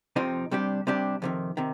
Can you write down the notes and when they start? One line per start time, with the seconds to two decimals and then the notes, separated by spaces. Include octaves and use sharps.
0.16 F2 C3 F3 C4 D#4
0.51 C3 G3 D4 G4
0.87 C3 G3 D4 G4
1.22 F2 C3 D#3
1.57 C3 D#3